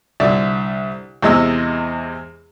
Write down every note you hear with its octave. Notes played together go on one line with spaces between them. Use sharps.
C2 D3 D5 E5
E2 C3 G#3 D#5 E6